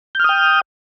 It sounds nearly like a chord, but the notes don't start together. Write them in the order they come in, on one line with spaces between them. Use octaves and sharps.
G6 F6 D#6 G5